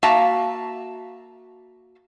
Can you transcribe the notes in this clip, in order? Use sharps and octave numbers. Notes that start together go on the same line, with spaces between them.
A#3 F#4 E5 F5 A5 A#5